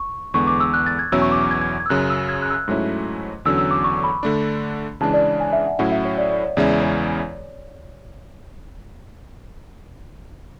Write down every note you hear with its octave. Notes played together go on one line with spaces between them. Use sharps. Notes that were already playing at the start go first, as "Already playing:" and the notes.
Already playing: C#6
E2 D3 G#3 B3 C#6
D6
E6
F#6
A6
G#6
E2 B2 F#3 C#4 E4 E6
C#6
D6
D6
G#6
G#6
G#6
E6
F#2 C#3 F#3 F#6
E6
G#6
F#6
E6
F#6
G#2 F#3 A3 C#4 E4
E2 D3 F#3 C#4 E6
E6
D6
C#6
B5
D3 A3 D4
C#3 E3 G#3 D4 A5
D5
G#5
E5
F#5
A2 F#3 C#4 E4 F#5
E5
C#5
D5
D5
C#5
E2 C#3 G#3 C#4 E4 D5
D5
C#5